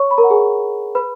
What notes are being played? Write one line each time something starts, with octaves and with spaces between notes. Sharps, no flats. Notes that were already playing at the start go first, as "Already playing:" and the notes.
Already playing: C#5 C#6
B5
A#4 A#5
F#5
G#4 G#5
B4 B5